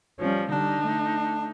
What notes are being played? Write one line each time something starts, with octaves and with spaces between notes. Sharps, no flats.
F3 G3 C#4
D3 G3 D4 D#4
A3